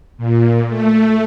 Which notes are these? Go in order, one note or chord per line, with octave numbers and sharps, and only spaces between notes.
A#2
A3